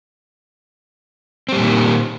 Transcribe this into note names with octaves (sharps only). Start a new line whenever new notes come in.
A#2 D#3 G3 C4